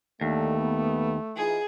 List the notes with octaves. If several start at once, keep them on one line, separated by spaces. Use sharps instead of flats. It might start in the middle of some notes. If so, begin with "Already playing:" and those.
D#2 D3 D#3 A3 A4
B3
E3 D#4 F4 G#4